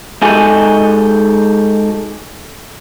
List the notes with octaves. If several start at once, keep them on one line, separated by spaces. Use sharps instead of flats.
G#3 D#4 F#4 G4 A4 G#5